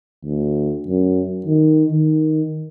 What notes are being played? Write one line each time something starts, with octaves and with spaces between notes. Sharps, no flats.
D2
F#2
D#3
D#3